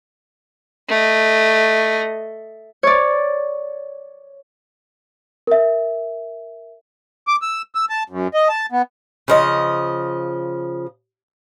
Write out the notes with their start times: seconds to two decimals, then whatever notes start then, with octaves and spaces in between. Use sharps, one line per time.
0.89 A3 D#5
2.83 C#5 D5
5.47 A#4 E5
7.28 D6
7.42 E6
7.75 E6
7.89 A5
8.10 F#2
8.34 D#5
8.49 A5
8.72 B3
9.28 C#3 F3 D#5